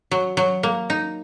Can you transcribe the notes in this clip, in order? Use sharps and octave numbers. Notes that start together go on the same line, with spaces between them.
F#3
F#3
A#3
D#4